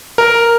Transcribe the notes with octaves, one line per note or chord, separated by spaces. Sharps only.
A#4